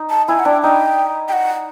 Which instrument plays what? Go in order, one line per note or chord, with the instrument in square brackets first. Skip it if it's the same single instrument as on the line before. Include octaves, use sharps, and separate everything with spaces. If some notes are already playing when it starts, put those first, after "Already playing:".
Already playing: [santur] D#4
[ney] A5
[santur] E4 [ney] G#5
[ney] F#5
[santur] D4 [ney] G5
[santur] D#4 [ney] G5
[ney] G5
F#5